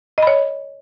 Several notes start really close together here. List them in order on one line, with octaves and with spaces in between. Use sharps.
D#5 B5 C#5